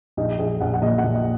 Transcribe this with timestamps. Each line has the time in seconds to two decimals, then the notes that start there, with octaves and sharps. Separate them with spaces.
0.17 A#1 D#4
0.39 A#1 G#4
0.60 A#1 F#5
0.73 F#5
0.82 A#2 D#5
0.98 F#5
1.04 A#2
1.15 D#5